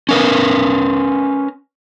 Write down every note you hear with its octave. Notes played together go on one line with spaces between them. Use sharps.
C#4 A#4 B4